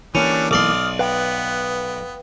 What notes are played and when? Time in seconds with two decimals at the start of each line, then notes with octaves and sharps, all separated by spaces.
0.15 D3 E3 G3 A#3 C#4 D4
0.51 B1 D5 C6 D6 D#6 F6
0.99 B3 B4 F5 G5